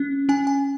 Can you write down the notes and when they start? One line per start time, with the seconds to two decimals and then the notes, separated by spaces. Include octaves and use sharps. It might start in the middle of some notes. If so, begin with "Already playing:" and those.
Already playing: C#4
0.29 C#4 G#5
0.47 G#5